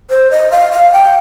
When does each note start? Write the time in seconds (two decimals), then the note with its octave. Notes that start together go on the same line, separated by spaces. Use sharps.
0.10 C5
0.31 D#5
0.52 F5
0.72 F5
0.93 G5